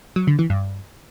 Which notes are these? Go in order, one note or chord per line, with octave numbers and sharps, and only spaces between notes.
F#3
D3
E3
G2